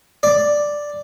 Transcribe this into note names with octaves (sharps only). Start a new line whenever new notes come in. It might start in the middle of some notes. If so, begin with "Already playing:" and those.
D5